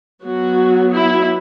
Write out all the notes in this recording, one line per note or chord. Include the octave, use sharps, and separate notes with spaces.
F#3 B3 F#4
E4